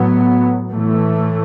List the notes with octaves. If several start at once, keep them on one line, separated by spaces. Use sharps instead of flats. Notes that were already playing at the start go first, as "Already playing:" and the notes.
Already playing: A2 F#3 B3
A2 E3 A3